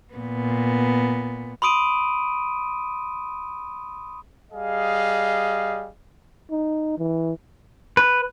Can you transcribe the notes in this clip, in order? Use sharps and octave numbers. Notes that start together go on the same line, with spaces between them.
A#2 B3
B5 C6 D#6 D7 D#7
G3 G#4 D#5 F5
D#4
E3
B4